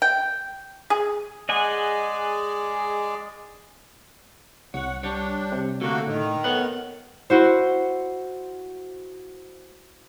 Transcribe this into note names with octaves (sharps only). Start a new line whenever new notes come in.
G5
G#4
G#3 G#4 D5 D#5 F#5 G#5
C2 C#5 F#5
G3 D4 C#5
C3
D3 A3 A#3 F#4
A2 D#3
B3 A4 C#5 F#5
E4 F#4 C5